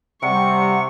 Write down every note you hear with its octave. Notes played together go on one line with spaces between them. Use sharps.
C3 G3 F#5 C#6